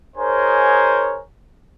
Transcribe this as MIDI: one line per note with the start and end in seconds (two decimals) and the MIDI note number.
0.17 1.19 63
0.17 1.19 68
0.17 1.19 70
0.17 1.19 72
0.17 1.19 73
0.17 1.19 80